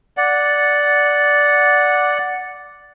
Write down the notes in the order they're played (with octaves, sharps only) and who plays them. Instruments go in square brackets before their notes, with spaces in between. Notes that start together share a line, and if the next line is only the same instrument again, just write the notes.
[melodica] D5 F#5